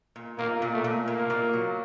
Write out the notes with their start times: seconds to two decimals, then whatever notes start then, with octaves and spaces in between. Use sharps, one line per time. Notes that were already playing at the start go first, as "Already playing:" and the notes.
0.16 A#2
0.38 A#2 A#3
0.62 A#2
0.73 A3
0.84 A#2
1.07 A#2 A#3
1.30 A#2
1.53 F#3